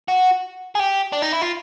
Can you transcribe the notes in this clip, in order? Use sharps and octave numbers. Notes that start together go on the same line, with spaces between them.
F#4
G#4
G4
D4
D#4
E4
F4